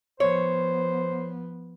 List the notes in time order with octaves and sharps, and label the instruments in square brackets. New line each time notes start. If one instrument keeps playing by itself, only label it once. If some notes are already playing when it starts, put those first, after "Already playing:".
[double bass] F3 B3 [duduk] C5 [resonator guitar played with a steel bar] C#5